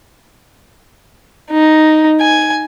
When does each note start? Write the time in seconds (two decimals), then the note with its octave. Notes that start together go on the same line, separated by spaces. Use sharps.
1.51 D#4
2.21 G#5